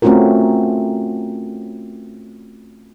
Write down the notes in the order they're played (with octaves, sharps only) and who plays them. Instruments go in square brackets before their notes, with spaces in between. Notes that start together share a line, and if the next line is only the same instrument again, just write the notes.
[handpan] A3 C4 C#4 F4 F#4 A#4